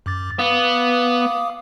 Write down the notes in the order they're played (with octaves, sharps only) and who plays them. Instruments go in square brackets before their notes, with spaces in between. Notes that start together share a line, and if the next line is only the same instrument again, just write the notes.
[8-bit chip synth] F#2 D6 A6
[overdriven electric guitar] B3 [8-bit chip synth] F5 D6 D#6